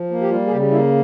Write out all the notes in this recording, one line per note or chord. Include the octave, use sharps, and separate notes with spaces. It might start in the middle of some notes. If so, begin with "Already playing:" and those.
Already playing: F3
A#3
G4
G3 F4
G#4
C#3 G4
A#3 E4